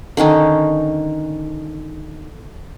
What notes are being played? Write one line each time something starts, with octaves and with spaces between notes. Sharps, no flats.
D3 D#3 C#4 D#4